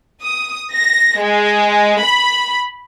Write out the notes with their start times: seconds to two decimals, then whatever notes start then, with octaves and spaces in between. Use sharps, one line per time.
0.23 D#6
0.73 A#6
1.20 G#3
2.02 B5